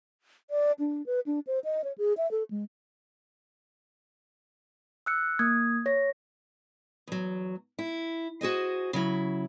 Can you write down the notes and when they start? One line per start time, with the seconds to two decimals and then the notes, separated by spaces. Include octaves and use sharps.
0.50 D5
0.79 D4
1.06 B4
1.26 D4
1.47 C5
1.64 D#5
1.84 C#5
1.98 G#4
2.17 E5
2.31 A4
2.50 G#3
5.06 E6 F#6 C#7
5.39 A#3 D#6 G#6
5.86 C#5 A#6
7.07 E2 F#3
7.79 E4
8.41 F#4 G#4 C5 D#5
8.93 C#3 F#3 E4